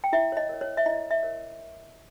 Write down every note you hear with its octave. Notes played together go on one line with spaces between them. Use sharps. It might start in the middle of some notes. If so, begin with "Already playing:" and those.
G5
E4 E5
C#5
D#5
A#4 C#5
C#5
E5
E4 D#5
E5
A#4 C#5